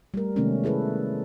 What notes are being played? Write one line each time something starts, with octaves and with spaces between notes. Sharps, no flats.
G3 A3 A#4
C3 D#3 G#3 A3 B3 C#4
E4 G#4 A4 B4